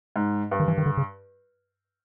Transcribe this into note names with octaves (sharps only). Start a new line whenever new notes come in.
G#2
G2
D#3
E3
D#3
D3
C#3